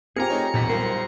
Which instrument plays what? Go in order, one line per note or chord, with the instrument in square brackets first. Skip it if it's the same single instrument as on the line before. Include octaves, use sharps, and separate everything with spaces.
[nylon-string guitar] C4 F4 G4 [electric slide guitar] G#4 A#4 G#5 [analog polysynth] A#5 C#7
[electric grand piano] A3 D#4 C#5
[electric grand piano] B1 E2 B6 [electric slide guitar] A#2
[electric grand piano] B1 G3 [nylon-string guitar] F4 A#4 [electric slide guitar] C5